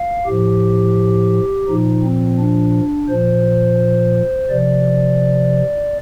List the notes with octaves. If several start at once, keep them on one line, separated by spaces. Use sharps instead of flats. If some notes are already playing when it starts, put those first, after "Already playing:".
Already playing: F5
A2 F3 G4
A#2 F3 D#4
C4
D4
A#2 F3 C5
C3 F3 D5